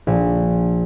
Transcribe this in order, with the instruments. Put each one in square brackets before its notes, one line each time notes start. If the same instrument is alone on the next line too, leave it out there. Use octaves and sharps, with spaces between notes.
[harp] A#1